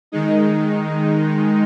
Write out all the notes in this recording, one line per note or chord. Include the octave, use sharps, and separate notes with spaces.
D#3 G#3 D#4